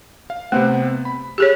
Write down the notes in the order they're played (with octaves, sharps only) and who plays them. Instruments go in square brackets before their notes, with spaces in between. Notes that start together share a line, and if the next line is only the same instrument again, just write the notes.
[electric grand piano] F5
[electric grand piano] C3 B3 C4 [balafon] A3
[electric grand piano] B5
[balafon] G4 G#4 C#5